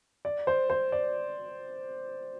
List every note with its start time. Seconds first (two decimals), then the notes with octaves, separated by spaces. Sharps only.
0.25 D5
0.47 C5
0.70 C5
0.92 D5